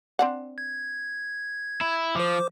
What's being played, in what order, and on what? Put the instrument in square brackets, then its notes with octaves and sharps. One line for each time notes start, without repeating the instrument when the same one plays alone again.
[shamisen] C4 D4 F#5
[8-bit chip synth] G#6
[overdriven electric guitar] E4
[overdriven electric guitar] F3 [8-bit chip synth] C5 D6